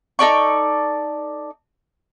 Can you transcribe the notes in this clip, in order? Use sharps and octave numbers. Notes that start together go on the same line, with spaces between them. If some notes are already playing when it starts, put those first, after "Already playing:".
D#4 A4 D5 C#6